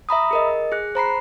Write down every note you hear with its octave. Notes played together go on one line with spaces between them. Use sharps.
E5 A#5 B5 D#6
G#4 A#4 D#5
G#4 F#6
C5 A#5 B5 C7